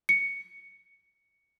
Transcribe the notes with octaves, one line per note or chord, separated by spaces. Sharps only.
C#7